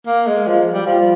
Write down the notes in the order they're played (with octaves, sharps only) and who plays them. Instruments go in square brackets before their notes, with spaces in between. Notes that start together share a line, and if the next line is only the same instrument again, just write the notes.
[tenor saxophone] A#3
G#3
F3
G3
F3